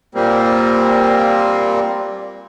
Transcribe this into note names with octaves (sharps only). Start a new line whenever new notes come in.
A#2 G3 A#3 C4